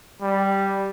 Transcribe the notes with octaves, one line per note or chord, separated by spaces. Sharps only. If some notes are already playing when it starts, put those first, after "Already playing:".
G3